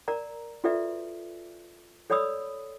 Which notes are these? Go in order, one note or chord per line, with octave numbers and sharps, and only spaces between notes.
A#4 D5 A#5
F4 F#4 A4 B4 D5 E5
A4 C#5 D5 B5 D#6 E6